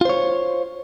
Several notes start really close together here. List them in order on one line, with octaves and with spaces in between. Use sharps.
F4 C5 C#5